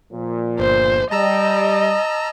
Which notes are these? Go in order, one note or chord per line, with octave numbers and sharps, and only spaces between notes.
A#2 F3
G1 C5
G3 D#5 A5 A#5 E6